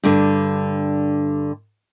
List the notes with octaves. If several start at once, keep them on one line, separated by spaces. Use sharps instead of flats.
G2 D3